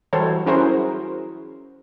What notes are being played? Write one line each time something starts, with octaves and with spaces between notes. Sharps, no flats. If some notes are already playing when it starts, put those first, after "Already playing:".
E3 F#3 G3 A4 C5 C#5
C#4 E4 F#4 G#4 A#4 C5